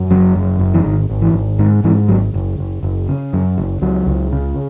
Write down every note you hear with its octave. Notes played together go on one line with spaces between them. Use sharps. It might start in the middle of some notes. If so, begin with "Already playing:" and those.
Already playing: F#2
F#1 F#3
F#2
F#1
E3
G#1 D#3
G#1
E3
G#1
G#2 D#3
G#2 E3
G#1 F#3
F#1
F#1
F#1
C#3
F#2
F#1
C#2 F#3
C#2
C#3